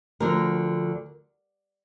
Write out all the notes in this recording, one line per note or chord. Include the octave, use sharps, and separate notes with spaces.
D2 D3 F3 A#4